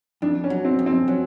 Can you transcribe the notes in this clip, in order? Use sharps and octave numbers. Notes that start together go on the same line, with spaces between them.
F2 D4
C#4
F#3
C4
F2
C4
F#3 C#4